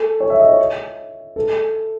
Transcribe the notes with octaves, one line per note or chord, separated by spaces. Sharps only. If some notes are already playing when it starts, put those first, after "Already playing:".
Already playing: A4
C#5
E5
D#5
C#5
A4